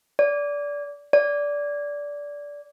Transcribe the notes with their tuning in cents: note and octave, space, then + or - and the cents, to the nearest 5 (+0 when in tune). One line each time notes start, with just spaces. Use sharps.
D5 -20
D5 -15